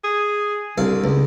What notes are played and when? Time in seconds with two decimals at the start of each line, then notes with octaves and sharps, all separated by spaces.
0.04 G#4
0.78 C2 D3 F5
1.04 C#2